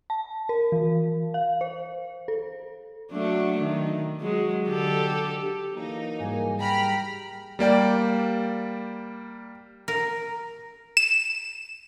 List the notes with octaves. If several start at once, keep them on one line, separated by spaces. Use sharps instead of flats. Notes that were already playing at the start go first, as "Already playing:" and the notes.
A5
A#4
E3
F5
C5
A4
F#3 A3 D4
D#3
F#3 G#3
D3 G4 A4
E3 F#3 A#3 D#4
G#2 G3 G#5
G5 A#5 B5 F6
G3 A#3 D5 G5
A#4
E7